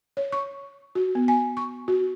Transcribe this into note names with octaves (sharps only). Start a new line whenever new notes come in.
C#5
C#6
F#4
B3
G#5
C#6
F#4